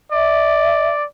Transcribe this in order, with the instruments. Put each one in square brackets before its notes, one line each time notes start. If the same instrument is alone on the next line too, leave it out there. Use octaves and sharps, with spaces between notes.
[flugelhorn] D5 [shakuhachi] E5